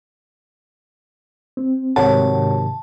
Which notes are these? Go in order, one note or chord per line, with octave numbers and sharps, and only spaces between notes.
C4
G#2 C3 D#3 F#4 C#5 F#5 A5